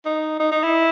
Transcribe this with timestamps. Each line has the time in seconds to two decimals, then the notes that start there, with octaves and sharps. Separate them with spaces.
0.05 D#4
0.40 D#4
0.52 D#4
0.63 E4